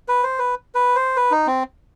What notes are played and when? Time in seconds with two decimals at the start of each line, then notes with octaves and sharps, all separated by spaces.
0.08 B4
0.23 C5
0.39 B4
0.75 B4
0.95 C5
1.17 B4
1.31 D#4
1.47 C4